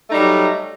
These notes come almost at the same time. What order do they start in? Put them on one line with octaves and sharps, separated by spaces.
A3 D#4 G3 F#3